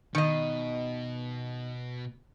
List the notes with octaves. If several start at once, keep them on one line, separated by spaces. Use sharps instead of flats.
B2 D#3 D#5